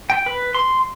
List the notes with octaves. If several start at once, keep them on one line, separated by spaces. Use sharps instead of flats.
G5
B4
C6